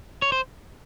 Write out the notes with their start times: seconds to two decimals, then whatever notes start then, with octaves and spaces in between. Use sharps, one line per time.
0.22 C#5
0.32 C5